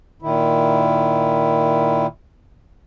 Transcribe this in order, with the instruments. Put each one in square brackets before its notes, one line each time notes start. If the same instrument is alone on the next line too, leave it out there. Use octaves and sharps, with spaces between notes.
[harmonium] A#2 D#3 E4